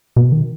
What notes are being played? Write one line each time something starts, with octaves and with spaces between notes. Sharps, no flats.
B2
D#3